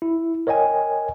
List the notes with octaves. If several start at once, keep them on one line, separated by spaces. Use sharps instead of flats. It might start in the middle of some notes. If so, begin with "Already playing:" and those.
E4
A#4 C#5 D#5 G5 G#5